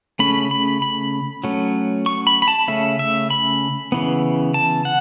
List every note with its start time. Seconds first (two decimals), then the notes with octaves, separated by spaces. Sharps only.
0.19 C#3 A3 C#4 B5
0.51 B5
0.82 B5
1.44 F#3 A3 C#4
2.06 C#6
2.27 B5
2.42 B5
2.48 A5
2.68 C#3 A3 C#4 E5
2.99 E5
3.30 B5
3.92 C#3 E3 B3
4.54 A5
4.85 F#5